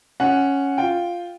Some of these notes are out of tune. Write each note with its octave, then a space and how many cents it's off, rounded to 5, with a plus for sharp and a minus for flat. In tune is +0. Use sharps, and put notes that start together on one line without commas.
C#4 +0 F#5 +0
F4 +0 G5 +0